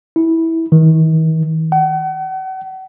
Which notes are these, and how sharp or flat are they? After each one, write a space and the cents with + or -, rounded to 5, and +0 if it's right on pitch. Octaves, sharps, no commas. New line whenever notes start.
E4 -15
D#3 +45
F#5 +40